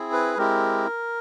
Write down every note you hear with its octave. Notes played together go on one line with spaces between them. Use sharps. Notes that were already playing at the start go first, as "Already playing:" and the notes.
Already playing: C4 E4 G#4
B4
G#3 C4 E4 G4 A#4